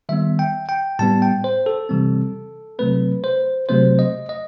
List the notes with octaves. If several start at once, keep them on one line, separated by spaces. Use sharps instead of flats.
D#3 G3 B3 E5
G5
G5
A2 G3 B3 A5
G5
C5
A4
C3 E3 G3 C4
C3 F#3 A3 C4 B4
C5
C3 F#3 A3 C4 C5
D#5
D#5